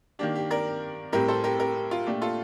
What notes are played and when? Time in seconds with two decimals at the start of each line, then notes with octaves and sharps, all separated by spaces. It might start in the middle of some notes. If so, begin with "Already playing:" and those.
0.19 D#3 A#3 D4 G4
0.35 G4
0.51 A#4 D5
1.12 A2 G3 C4 G4 A#4
1.28 A4 C5
1.44 G4 A#4
1.59 G4 A#4
1.91 F4
2.06 A#2 A3 D4 G4
2.22 F4 A4